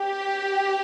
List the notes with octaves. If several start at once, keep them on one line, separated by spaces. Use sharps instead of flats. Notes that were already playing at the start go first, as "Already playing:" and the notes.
Already playing: G4